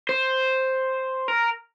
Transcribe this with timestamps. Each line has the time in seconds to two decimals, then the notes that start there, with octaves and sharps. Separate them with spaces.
0.09 C5
1.28 A#4